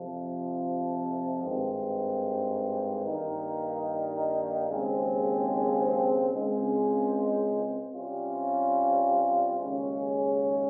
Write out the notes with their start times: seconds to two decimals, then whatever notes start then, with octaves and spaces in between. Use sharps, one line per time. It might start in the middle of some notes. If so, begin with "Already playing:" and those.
Already playing: F2 C3 F3
1.42 G#1 G2 D#3 G#3 C4
3.05 G2 D#3 A#3 D#4
4.68 D#2 C#3 G#3 C4
6.31 C#2 C#3 G#3 C4
7.94 C3 G3 C#4 F4
9.58 D#2 C#3 G#3 C#4